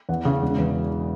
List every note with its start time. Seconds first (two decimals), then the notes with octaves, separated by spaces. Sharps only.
0.09 E2 F#5
0.25 C#3
0.42 E1
0.58 E2